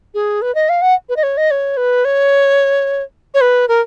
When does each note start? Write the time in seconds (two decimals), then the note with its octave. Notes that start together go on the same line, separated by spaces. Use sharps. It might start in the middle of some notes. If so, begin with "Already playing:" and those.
0.14 G#4
0.42 B4
0.55 D#5
0.69 F5
0.82 F#5
1.09 B4
1.16 D#5
1.23 C#5
1.37 D#5
1.51 C#5
1.77 B4
2.05 C#5
3.34 C#5
3.41 B4
3.68 A#4